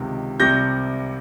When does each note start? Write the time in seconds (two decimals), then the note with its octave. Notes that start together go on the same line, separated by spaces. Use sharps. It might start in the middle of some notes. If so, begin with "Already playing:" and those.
Already playing: C#2 C3 D#3
0.40 C2 C3 G3 G6 A#6